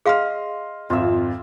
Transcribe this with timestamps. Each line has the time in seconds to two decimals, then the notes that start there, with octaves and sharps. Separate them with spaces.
0.06 G#4 D#5 F5 C6 F6
0.90 G#1 F2 F4 E5